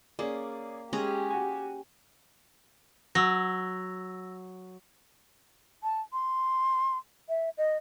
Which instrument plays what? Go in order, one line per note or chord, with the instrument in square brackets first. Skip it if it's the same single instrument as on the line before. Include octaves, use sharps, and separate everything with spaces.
[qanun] A#3 [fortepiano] C#4 G#4 D5
[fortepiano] G#3 [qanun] C#4 G#4 A#5 [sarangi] G4
[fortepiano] F#4 G#5
[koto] F#3 [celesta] E6 A#6
[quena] A5
C6
E5
D#5